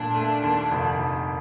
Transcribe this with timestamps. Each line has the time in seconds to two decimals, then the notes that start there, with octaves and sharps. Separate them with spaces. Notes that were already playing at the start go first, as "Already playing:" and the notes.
Already playing: A#2 A3 D4
0.14 A3
0.42 D#2
0.71 F1
0.99 F1